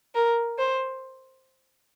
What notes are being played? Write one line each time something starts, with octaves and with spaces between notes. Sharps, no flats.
A#4
C5